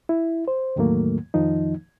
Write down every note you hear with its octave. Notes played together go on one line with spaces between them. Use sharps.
E4
C5
E2 A2 D#3 F#3 A3 A#3
F2 D#3 F3 D#4